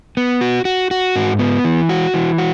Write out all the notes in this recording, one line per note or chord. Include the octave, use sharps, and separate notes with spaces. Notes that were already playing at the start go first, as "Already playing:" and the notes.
B3
F#4
F#4
F#4
G#2
B3
E3
F#4
E3
F#4